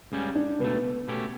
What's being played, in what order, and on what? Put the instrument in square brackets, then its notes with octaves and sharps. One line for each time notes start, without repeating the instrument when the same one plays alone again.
[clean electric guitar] C#2 C#3 G3 C#4
[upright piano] D4
[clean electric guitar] C#2 B2 A3 [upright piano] B3
[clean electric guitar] B2 A3 C#4 G4